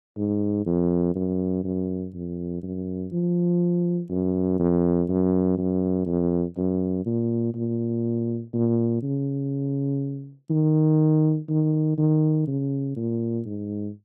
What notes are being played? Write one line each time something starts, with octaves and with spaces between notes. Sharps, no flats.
G#2
F2
F#2
F#2
F2
F#2
F3
F#2
F2
F#2
F#2
F2
F#2
A#2
A#2
A#2
C#3
D#3
D#3
D#3
C#3
A#2
G#2